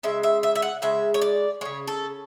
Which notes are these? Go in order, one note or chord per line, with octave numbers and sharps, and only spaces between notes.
C#3 G#3 E5
E5
E5
E5
F#5
C#3 G#3 E5
C#5
D5
C#3 G#3 C#5
A4